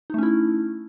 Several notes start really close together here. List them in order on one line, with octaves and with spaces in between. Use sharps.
D#4 A3 C#4 E4